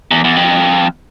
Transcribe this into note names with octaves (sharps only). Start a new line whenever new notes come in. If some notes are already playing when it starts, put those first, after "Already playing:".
E2
E2
F2